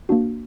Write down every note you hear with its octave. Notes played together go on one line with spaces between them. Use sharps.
A#3 D4 F#4